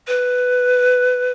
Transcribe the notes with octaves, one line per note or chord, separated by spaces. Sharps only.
B4